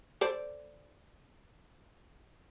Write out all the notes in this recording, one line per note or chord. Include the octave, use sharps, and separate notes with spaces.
A4 C5 D5